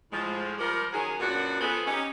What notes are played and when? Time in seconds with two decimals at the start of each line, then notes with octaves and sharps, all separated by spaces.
0.12 A2 F3 G#3
0.58 F3 G3 G4 A#4
0.93 D#3 F#3 C#4 G#4
1.19 F#2 A#2 B3 D4 F#4
1.60 F3 B3 C#4 G#4 A4 B4
1.87 C#4 D#4 G4